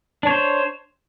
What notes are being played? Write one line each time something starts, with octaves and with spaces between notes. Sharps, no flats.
D4 C5 C#5